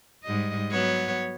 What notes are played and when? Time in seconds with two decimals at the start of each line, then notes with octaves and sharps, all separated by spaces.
0.24 G#2 G3 D#5
0.71 F#3 B3 C#5